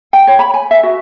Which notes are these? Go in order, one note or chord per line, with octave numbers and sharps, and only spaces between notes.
G5
C#5
B5
G#5
E5
F#4